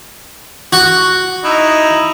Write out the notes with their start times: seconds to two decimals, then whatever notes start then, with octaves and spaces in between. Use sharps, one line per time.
0.73 F#4
1.44 D#4 E4